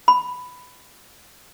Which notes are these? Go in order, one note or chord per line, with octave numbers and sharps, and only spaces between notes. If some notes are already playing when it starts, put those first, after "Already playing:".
B5